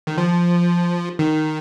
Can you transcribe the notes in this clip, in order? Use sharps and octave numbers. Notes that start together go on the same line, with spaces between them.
D#3
F3
D#3